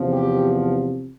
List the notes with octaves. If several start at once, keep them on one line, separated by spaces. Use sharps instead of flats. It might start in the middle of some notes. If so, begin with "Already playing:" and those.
Already playing: E2 C3 F3
G4